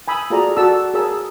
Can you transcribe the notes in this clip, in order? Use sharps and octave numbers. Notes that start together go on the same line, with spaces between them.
G#5 B5 D#6 E6
F4 F#4 G#4 A4 D5 A#5
F#4 A4 D5 A5 E6
G#4 A#4 C#5 A5 D#6 E6